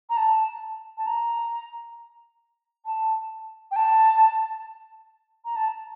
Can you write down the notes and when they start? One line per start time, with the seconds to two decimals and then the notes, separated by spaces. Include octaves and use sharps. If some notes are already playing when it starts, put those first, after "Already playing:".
0.10 A#5
0.17 A5
0.97 A5
1.07 A#5
2.86 A5
3.71 G5
3.76 A5
5.45 A#5
5.56 A5